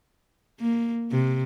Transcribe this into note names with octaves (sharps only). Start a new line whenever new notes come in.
A#3
C3